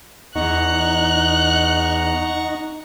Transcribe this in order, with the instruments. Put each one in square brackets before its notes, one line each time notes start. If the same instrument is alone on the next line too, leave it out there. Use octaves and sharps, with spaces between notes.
[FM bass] E2 [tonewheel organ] D#4 [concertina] F#5 A#5 C#6 [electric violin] F#6